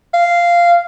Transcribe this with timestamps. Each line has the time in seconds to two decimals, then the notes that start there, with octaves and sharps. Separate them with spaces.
0.14 F5